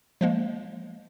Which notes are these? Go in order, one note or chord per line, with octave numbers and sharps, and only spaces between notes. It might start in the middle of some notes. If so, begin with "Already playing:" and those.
F3 G#3 A#3